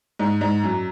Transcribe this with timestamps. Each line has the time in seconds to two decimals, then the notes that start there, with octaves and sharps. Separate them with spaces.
0.19 G#2
0.41 G#2
0.63 F#2